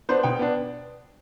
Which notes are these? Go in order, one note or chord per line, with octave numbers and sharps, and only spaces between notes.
B3 D4 C5
B2 G5
B3 D4